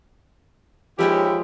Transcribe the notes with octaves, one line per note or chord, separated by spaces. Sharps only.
D#2 F3 G#3 E4 G4 C#5